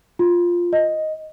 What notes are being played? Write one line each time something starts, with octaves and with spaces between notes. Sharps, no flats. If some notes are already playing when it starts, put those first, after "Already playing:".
F4
D#5